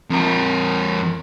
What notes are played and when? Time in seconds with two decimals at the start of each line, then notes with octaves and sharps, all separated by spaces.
0.10 F2 A#4